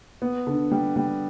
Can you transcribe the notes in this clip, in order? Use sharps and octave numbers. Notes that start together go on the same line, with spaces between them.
B3
D3
G3
G3